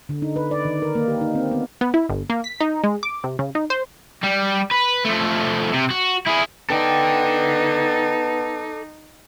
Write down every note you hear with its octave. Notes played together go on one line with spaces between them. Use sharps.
D3
D#4
B4
D5
D#3
A#4
A#3
G4
D#4
C4
B3
B3
E4
G1
A#3
B6
D#4
G#3
D6
C3
C#3
D#4
C5
G3
B4
F3 A3
C3
F#4
E4 G#4
B3 D#4 A4 D5 G5